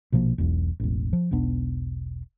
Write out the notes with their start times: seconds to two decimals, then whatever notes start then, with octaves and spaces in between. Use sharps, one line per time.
0.12 A#1 B2 F3 A#3
0.38 E1 B1 E2
0.80 E1 A1
1.13 F3
1.31 E1 B1 B3 D4